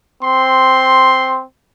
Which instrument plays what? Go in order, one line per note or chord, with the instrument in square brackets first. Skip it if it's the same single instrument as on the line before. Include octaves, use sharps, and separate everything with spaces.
[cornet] C4 [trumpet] C6